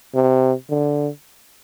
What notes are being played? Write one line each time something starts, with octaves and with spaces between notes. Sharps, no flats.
C3
D3